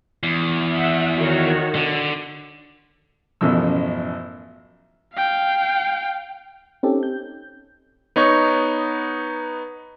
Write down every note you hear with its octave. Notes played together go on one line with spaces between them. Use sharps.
E2
E5 F#5
D#3 F#4 C#5
D3
A1 F#2 B2 F3 E6
F5 G5
C4 C#4 D#4 G4 A4
G6
B3 D#4 C#5 C#6